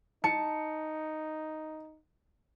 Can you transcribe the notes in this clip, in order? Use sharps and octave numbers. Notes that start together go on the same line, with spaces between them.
D#4 A5 C#7